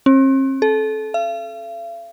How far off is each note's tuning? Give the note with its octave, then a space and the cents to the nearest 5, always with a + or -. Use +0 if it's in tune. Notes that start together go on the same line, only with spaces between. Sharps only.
C4 +45
A4 -25
F5 -45